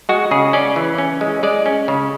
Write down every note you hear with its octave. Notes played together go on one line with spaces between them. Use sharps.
G#3 F#4
C#3 G#4
C#4 D5
E3
C#4
G#3
G#3 D5
C#4
C#3